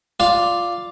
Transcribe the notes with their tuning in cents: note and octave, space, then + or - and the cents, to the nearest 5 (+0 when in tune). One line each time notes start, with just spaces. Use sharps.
F4 +0 D5 +0